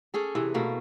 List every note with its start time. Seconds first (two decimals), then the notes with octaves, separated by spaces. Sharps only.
0.14 C#4 G#4 A4
0.35 C3 E3
0.54 B2 A3 A#3